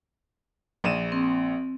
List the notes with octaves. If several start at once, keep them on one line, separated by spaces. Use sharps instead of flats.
A#1 D#7 E7
C4